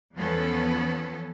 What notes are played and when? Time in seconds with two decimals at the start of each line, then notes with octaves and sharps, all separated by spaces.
0.15 E2 F3 B3 C#4 A4